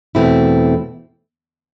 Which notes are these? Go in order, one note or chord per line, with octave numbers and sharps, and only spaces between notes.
E2 B2 A3 C4 E4